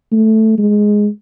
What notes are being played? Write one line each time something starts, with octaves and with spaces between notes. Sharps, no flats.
A3
G#3